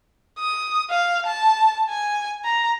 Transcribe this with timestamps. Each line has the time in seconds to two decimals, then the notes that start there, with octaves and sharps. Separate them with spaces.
0.39 D#6
0.91 F5
1.26 A5
1.90 G#5
2.45 A#5